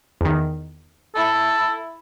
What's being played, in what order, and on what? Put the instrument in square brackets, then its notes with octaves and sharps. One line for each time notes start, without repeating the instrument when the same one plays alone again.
[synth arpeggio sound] E2 D#3
[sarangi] E4 [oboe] A4